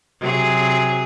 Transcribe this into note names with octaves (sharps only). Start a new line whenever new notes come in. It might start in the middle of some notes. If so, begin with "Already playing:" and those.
C3 F#3 G#4